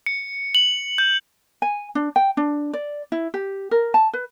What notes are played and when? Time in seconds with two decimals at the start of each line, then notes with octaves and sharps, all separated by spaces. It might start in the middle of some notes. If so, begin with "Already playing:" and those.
0.06 C#7
0.55 F#7
0.98 G6
1.62 G#5
1.95 D4
2.16 G5
2.37 D4
2.73 D5
3.12 E4
3.34 G4
3.71 A#4
3.94 A5
4.14 B4